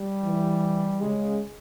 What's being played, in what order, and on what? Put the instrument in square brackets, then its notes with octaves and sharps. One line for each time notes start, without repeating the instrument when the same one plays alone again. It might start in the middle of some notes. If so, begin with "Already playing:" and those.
Already playing: [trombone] G3
[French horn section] E3
[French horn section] C#3 [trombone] G#3